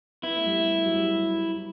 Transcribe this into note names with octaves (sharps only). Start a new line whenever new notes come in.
B3 E4
A3
G3
A3
F#3
G3